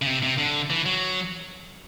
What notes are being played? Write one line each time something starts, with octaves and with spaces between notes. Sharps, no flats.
C#3
C3
C3
D3
E3
F#3